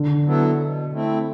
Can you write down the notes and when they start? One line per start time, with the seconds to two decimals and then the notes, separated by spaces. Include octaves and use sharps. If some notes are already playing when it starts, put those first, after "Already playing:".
Already playing: D3
0.25 F#3 B3 E4 A4
0.58 B2
0.92 A3 C4 E4